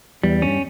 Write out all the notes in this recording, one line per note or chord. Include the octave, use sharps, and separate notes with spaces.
E2 G3
G2 C#4